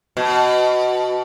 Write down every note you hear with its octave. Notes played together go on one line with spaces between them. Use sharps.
B2